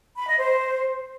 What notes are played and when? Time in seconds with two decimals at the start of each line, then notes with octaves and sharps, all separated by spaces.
0.17 B5
0.28 D#5
0.39 C5